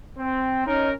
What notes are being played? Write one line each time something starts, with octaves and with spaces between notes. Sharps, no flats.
C4
C#4 D#4 A#4